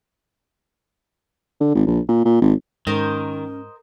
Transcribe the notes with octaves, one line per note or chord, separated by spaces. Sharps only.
D3
G#1
A#1
A#2
A#2
G#1
G#2 D#3 C#4 A#4 C5 D#5